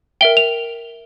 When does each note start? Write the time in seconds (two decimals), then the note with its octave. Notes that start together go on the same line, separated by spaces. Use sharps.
0.21 A#4 E5 G5 G7
0.37 F7